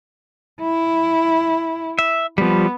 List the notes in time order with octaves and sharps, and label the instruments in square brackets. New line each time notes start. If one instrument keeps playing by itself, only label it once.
[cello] E4
[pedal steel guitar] E5
[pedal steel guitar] F3 G3 [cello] B3